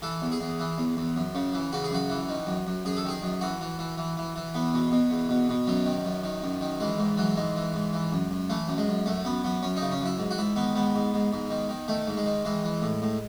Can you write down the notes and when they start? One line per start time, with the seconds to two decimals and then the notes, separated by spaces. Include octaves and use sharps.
0.02 E3 A4
0.22 E2
0.32 G#4
0.40 E2
0.60 E3
0.78 E2
0.97 E2
1.16 F#2
1.35 C#3
1.53 E3
1.73 C#3 F#4
1.84 G#4
1.91 F#2 F#4
2.10 E3
2.29 D#3
2.47 F#2
2.67 F#2
2.85 F#2 G#4
2.97 A4
3.05 D#3 G#4
3.22 F#2
3.41 E3 F#4
3.61 E3
3.79 E3
3.98 E3
4.17 E3
4.36 E3
4.55 E2 B3
4.74 B2
4.92 B2
5.11 E2
5.29 B2
5.49 B2
5.67 F#2 F#3
5.86 D#3
6.05 F#2
6.24 D#3
6.42 F#2
6.61 D#3
6.80 E3 G#3
6.99 G#2
7.17 E3 F#3
7.36 G#2 G#3
7.56 E3
7.74 G#2
7.93 E3
8.12 F#2
8.31 F#2
8.50 E3 A3
8.68 F#2
8.78 G#3
8.88 F#2
9.06 F#2 A3
9.25 F#2 B3
9.44 F#2 B3
9.63 F#2 C#4
9.77 C#3 D#4
9.92 C#4
10.00 F#2
10.06 E4
10.19 G#2
10.31 F#4
10.38 G#2 E4
10.56 D#3 B3
10.75 G#2 B3
10.95 G#2
11.14 G#2
11.33 G#2
11.50 D#3
11.69 D#3
11.88 D#3 A3
12.08 G#2
12.17 G#3
12.26 D#3
12.45 E3 G#3
12.64 E3
12.82 A2
13.02 A2